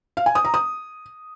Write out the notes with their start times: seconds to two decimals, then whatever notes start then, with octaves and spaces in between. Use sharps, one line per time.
0.17 F5
0.26 G#5
0.35 D#6
0.45 A#5
0.54 D#6